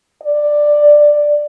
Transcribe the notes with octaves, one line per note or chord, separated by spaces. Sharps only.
D5